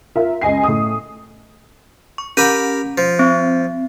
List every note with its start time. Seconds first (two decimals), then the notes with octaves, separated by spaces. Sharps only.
0.15 F4 A#4 E5
0.41 C#2 D#5 G#5 C7
0.63 A2 D#6
2.18 C#6
2.37 C#4 G4 A#4 B5
2.98 F3
3.19 C4